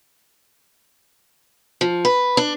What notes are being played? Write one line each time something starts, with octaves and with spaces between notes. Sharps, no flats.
F3
B4
D4